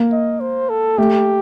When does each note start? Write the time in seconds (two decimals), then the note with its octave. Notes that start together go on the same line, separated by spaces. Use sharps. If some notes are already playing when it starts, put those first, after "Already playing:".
Already playing: A#3
0.12 D#5
0.40 C5
0.69 A4
0.98 A3 G4